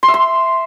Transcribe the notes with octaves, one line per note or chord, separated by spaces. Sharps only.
C6
E5
C6